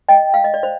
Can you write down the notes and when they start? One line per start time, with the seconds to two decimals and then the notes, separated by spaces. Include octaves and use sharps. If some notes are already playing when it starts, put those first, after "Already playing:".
0.09 D#5 G5
0.34 F5
0.44 D#5
0.54 D5
0.63 C5